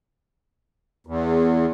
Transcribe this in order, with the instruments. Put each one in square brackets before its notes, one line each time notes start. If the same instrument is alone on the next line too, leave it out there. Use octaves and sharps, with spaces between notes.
[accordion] E2